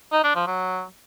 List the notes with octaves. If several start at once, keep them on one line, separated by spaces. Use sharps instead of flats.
D#4
D4
F3
F#3